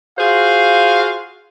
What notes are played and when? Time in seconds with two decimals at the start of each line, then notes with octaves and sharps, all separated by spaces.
0.18 F4 F#4 G#4 C5 F5